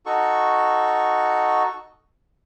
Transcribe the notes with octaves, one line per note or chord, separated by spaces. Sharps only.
D#4 F#4 A4 C#6